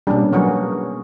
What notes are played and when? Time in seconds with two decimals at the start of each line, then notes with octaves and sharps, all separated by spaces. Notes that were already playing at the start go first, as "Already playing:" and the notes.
0.07 B2 G3 A#3 C#4 D4 G#4
0.33 F#3 B3 F#4 G#4 A#4